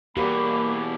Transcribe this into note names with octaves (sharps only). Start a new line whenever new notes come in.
B2 E3 A#3 G4 B5